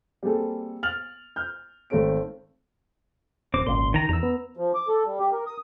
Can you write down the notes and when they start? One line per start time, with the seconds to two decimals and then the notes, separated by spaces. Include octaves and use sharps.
0.23 G3 A#3 C4 G#4 A4
0.83 F6 A6 F7 F#7
1.36 F6 G6
1.90 G#1 A3 C4 A4 C#5 D7
3.54 D1 C4 D6
3.67 G#1 C#2 A#2 C6
3.94 D#3 A#5
4.09 E2 A#5 E6
4.23 B3
4.57 F3
4.75 D6
4.88 A4
5.06 G3
5.19 G4
5.32 A#4
5.47 D#6